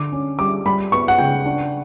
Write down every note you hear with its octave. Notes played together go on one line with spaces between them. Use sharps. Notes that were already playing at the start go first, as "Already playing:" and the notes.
Already playing: D3 D6
C#4
G3 D6
G3 B5
B3 C#6
F#5
C#3 G5
D4